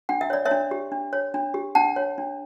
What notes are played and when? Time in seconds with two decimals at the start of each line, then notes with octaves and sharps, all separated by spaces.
0.09 D4 F#5
0.21 E5
0.30 C#5 D5
0.45 C#5 E5
0.51 D4
0.71 G4
0.92 D4
1.13 C#5
1.34 D4
1.54 G4
1.75 D4 F#5 A5
1.96 C#5
2.18 D4